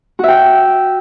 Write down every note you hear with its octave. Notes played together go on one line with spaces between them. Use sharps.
F#4 E5 G5